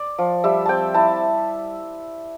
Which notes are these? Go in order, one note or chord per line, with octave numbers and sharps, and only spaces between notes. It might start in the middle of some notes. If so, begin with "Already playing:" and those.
Already playing: D5
F3
G3 E5
C4 G5 A5
E4 A5